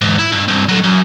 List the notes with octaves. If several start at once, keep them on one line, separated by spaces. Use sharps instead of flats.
E2 G#2
E4
G2
C2 G2
F#3 A3
F#2